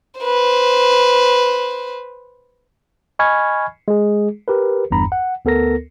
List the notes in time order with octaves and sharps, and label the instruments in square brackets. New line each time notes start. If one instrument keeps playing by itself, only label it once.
[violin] B4 C5
[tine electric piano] D#5 G#5 B5 C#6 F6 G#6
G#3 G#4
G4 A#4 B4
G1 E2 G2 A#5 B5
F#5
D2 B3 A4 A#4 A#6